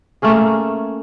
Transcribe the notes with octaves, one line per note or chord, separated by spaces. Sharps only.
A3 A#3 C#4 G#4